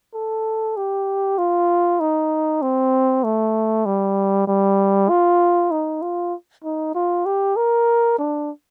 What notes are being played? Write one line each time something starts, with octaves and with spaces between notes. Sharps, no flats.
A4
G4
F4
D#4
C4
A3
G3
G3
F4
D#4
F4
D#4
F4
G4
A#4
D4